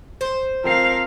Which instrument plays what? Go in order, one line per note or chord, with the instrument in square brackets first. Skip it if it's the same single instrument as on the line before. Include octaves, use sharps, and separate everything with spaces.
[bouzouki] C5
[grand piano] F3 C4 C7 [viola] A#4 F5